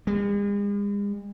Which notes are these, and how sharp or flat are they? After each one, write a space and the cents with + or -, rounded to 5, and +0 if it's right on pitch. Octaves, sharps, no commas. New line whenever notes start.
G#3 -45